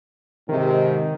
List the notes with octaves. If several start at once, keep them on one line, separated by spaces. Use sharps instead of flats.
G#2 C3 D#3